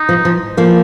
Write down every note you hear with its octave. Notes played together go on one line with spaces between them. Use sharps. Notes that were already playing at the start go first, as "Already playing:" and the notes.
Already playing: D#4
F3
F3
F3 A#3